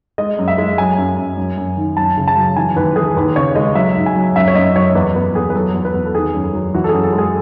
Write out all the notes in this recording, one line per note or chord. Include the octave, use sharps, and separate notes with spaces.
G#3 D#5
F#2
E5
G#3
F#3 G#5
F#2
F#2
F#2
F#2
D#3
F#2 A5
C#3
A5
F#3
E3 G#5
D#2 B4
E3 G#4
D#2 B4
C#3 C#5
G#3 D#5
F#3 E5
G#2
G#5
F#3
F#2 E5
C#5
F#2 D#5
F#3 C#5
E2 B4
E2 B4
E2 G#4
B4
F#3 A4
E2
B4
E2
A4
D#3 G#4
F#2
F#3
E3 F#4
A4
F#2 G#4
A4
G#3
G#4